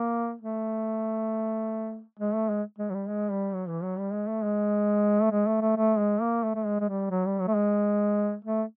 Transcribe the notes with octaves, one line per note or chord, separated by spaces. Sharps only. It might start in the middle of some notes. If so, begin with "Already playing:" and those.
Already playing: A#3
A3
G#3
A3
G#3
G#3
F#3
G3
G#3
G3
F#3
E3
F#3
G3
G#3
A3
G#3
A3
G#3
A3
A3
A3
G#3
A#3
A3
A3
G#3
G#3
G3
F#3
G3
F#3
A3
G#3
A3